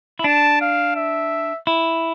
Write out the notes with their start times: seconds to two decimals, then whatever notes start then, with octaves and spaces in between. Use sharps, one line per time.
0.19 E4
0.24 D4 A5
0.61 F5
0.95 E5
1.67 E4